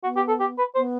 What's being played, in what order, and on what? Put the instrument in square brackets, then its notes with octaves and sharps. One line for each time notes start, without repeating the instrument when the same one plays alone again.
[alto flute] B3 [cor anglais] F#4
[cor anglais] G4
A4
G4
B4
[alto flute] B3 [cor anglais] C5